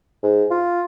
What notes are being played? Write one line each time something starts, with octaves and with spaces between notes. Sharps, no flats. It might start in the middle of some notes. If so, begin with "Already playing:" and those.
G#2
F4